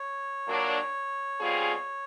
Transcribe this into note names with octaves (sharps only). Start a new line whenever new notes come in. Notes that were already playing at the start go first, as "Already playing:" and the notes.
Already playing: C#5
A#2 F#3 A#3 D4
B2 G3 C4 F4 G#4